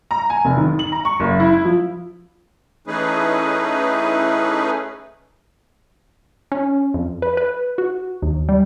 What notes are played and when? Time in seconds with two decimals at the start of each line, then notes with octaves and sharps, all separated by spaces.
0.11 A#5
0.30 G#5
0.45 F1
0.57 D#3
0.79 F#7
0.92 A#5
1.05 C#6
1.20 F#1
1.40 E4
1.65 F3
2.87 E3 A3 C#4 D#4 G#4 B4
6.52 C#4
6.94 F2
7.22 B4
7.37 B4
7.78 F#4
8.22 D#2
8.49 G3